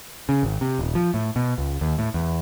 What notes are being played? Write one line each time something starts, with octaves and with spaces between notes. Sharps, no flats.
C#3
G#1
C3
D#1
F3
A2
B2
C#2
D#2
A2
E2